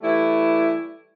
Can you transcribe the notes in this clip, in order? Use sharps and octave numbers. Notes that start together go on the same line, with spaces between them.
E3 G3 A3 E4